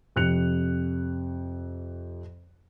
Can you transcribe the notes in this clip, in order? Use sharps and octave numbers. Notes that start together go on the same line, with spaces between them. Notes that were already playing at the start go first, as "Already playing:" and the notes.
F2 C3 F#6 C#7 F7